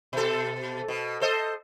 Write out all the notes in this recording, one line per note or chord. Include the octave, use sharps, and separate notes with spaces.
B2 A4
B2
A4 C5 D#5